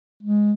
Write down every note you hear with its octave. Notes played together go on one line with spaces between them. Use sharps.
G#3